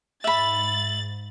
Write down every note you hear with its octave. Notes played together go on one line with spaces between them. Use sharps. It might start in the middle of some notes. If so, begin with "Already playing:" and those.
G#2 E5 B5 A6 F#7